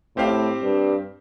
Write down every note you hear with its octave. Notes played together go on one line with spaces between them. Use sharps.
A2 C4 G4 C5 F5
G2